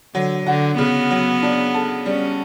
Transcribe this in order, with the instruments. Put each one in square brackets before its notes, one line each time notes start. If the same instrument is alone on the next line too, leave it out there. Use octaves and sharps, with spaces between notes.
[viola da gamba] D3 [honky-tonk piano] F#3
[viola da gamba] D3 [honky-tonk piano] F#4
[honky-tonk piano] C#3 [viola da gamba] B3
[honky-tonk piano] F#3
D4
A4
[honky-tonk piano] G3 [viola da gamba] C#4